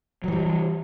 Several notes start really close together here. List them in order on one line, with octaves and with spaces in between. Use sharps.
F#3 E3 G3